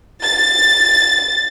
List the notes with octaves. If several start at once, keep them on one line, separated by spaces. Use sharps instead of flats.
A6